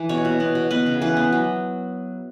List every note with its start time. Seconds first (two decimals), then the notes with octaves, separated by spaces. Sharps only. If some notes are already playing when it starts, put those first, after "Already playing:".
Already playing: E3
0.09 B2 C#5
0.25 B2
0.40 B3
0.55 B2
0.71 B3 B4
0.86 C#3
1.01 E3 B4
1.17 B3
1.32 F#3